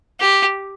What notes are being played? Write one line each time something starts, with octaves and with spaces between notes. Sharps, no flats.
G4